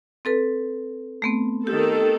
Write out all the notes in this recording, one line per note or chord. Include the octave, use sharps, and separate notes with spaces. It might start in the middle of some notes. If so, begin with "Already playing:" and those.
C4 A4 B4
A3 B3 C4
D#3 G4 A4